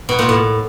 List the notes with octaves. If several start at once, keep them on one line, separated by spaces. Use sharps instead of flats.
B2
A#2
A2